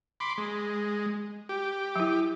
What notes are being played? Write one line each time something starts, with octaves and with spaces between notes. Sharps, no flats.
B5 C6 D6
G#3
G4
F#3 E4